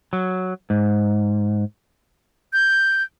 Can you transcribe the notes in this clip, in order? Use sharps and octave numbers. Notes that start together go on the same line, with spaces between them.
F#3
G#2
G6